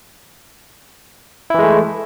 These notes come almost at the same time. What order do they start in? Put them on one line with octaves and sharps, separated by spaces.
E4 E3 G#3 A3